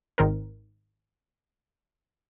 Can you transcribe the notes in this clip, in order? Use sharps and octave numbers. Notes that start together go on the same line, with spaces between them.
G#1 D#3 C4 A#4